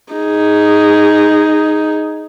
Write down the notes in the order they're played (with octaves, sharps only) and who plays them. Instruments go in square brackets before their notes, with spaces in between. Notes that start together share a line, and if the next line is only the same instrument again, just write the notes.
[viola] D#4 G#4